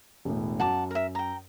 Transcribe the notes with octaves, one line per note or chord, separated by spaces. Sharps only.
E1 A2
F#2 F#5 A5 D6
A#4 E5
G5 A#5